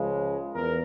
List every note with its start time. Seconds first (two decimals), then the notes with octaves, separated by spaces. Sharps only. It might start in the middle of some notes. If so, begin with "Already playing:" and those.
Already playing: C#2 C#3 F3 G#3
0.54 E2 A#4